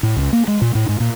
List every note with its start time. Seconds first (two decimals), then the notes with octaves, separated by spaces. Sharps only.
0.03 A2
0.16 C#2
0.33 A#3
0.48 G#3
0.62 A#2
0.75 A2
0.89 G#2
1.00 A#2